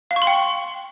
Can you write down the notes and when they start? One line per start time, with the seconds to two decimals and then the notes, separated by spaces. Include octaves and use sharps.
0.11 F5
0.16 C#6
0.22 C6
0.27 G5